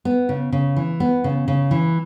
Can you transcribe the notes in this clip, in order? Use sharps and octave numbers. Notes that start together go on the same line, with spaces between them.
B3
C#3
C#3
E3
B3
C#3
C#3
E3